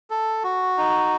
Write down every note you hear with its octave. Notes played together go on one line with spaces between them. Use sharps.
A4
F#4
D#4